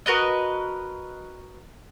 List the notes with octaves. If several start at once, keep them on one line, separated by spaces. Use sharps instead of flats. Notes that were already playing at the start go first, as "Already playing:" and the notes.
F#4 A#4 B4 D#5